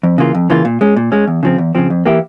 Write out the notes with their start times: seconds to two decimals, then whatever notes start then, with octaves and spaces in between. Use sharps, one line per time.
0.03 F2
0.18 C#3 E3 A#3 F4
0.35 F2
0.50 C#3 E3 A#3 F4
0.65 A#2
0.81 G#3 C#4
0.96 A#2
1.12 G#3 C#4
1.27 E2
1.43 C#3 F3 C4
1.58 E2
1.75 C#3 F3 C4
1.90 F2
2.06 E3 A#3 E4 G4